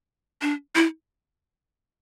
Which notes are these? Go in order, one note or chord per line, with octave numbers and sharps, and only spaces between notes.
D4
E4